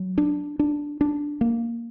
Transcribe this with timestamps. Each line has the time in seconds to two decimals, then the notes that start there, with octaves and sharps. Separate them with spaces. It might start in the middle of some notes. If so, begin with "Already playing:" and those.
Already playing: F#3
0.18 D4
0.59 D4
1.01 D4
1.41 A#3